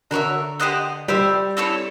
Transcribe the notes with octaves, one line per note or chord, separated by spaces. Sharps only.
D3 F#4 A#4 C#5 E5
G4 C5 D#5 F#5
G3 G4 C5 E5
C4 E4 A4 C#5